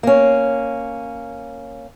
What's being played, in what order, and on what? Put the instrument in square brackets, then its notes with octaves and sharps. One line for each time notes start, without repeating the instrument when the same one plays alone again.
[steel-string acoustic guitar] A#3 C#4